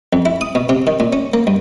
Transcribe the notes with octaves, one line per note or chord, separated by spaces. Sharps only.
F2
E4
D#6
B2
C3
D#3
A#2
C#4
A#3
G2